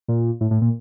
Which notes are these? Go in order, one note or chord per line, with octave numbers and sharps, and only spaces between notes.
A#2
A2
A2
A#2